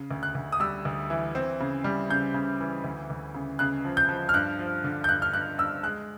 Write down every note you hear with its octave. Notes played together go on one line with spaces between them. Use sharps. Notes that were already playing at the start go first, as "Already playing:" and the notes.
Already playing: C#3
D2
F#6
D2
D#6
G3 E6
D2
E3
C4
C#3
G3
C#3 G6
C#3
E3
D2
D2
C#3
C#3 F#6
F3
G6
F3
F6
G2 F#6
F3
D3
G6
G2 F#6
F6
G2 F#6
G2 E6
G#3 F#6